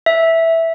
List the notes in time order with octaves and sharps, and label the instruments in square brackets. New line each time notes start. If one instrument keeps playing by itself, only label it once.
[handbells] E5